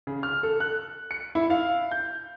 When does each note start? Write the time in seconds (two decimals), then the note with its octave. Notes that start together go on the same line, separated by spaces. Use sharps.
0.07 C#3
0.23 F6
0.43 A4
0.60 F#6
1.11 C#7
1.35 E4
1.50 F5
1.91 G6